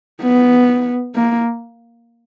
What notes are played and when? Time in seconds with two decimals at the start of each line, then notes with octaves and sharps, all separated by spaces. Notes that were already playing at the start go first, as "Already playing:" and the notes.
0.22 B3
1.15 A#3